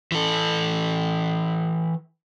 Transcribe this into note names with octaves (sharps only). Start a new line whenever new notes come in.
E3 A4